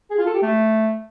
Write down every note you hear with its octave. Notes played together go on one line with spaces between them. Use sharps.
G#4
F4
A4
G4
A3